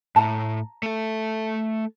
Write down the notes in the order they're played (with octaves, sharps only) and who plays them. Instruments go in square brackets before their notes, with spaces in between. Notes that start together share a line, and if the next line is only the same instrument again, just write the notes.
[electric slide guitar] A2 [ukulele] A5 A#5
[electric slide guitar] A3 A4